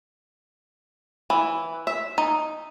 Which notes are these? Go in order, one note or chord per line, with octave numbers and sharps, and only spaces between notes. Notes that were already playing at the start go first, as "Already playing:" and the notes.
E3
E5
D#4